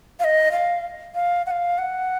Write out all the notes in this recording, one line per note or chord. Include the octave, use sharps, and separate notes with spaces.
F5
D#5
F5
F5
F#5
F5
F#5